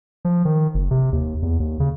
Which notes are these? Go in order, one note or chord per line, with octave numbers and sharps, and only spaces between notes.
F3
D#3
F#1
C3
D#2
E2
D#2
C#3